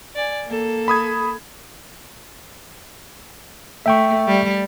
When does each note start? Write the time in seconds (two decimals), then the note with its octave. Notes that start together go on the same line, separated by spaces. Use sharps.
0.15 D5 G#5
0.47 A#3 A4
0.88 B5 D#6 G#6
3.86 A3 E5 G5 C#6
4.27 G3